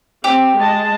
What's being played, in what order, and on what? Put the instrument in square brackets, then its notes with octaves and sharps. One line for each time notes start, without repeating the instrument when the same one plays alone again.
[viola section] C4 [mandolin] G4
[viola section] G#3 D#5 A5